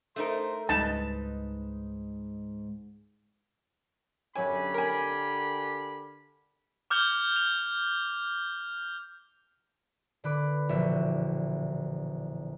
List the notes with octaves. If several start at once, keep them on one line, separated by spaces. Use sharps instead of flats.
A3 D#4 A#4 C5
C#2 G#2 G3 G#3 D#4 B4 A5
F#2 D3 G4 C#5 G#5 B5
A#4 G#5
D6 F6 G6 F7 G7
F7
D3 B4 D6
E1 A#1 E5